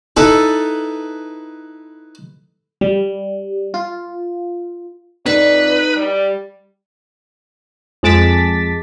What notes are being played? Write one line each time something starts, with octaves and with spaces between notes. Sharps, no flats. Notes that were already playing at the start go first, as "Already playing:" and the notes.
D#4 E4 A4 B4
G3
F4
F2 D#4 B4 D5
G3
F2 G#3 A5 D6 A6 B6